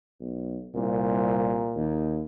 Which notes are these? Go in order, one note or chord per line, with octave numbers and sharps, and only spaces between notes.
B1
C2 A#2
D#2